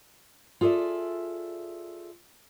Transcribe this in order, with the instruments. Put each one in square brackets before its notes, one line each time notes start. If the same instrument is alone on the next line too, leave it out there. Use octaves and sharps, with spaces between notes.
[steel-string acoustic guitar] F4 G#4 A4 D5 E5